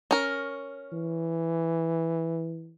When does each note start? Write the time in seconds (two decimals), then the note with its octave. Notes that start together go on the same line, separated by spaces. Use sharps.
0.11 C#4 A#4
0.93 E3